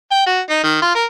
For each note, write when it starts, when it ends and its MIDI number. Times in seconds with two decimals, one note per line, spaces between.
0.11 0.22 79
0.26 0.40 66
0.50 0.60 63
0.63 0.81 51
0.82 0.95 65
0.95 1.05 70